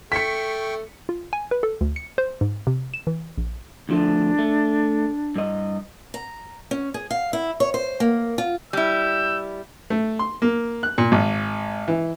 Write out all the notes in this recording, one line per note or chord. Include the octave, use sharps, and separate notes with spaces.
A3 G5 C#6 B6 C#7
F4
G#5
B4
A4
D2
C#7
C5
G#2
C3
E7
E3
A#1
D2 F3 A3 D4
A3
G2 D#5
A#5
C#4
G#4
F5
E4
C#5
C5
A#3
F4
G3 E4 E6 G6
A3
C6
A#3
F#6
A#2
G#1
E3